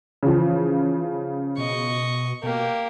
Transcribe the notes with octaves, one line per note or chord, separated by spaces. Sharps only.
C#3 E3 F3
B2 D#5 C#6
B2 A#3 G4